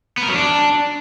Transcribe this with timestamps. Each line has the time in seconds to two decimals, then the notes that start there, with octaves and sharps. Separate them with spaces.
0.18 B3
0.23 A#4
0.28 F#3
0.34 D4